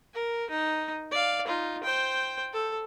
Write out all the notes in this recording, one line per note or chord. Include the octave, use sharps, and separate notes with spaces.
A#4
D#4
D5 F5
D#4 F4
C5 G5
A4